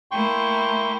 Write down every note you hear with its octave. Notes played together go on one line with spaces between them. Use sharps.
A3 A#3 E4 G5 C6 C#6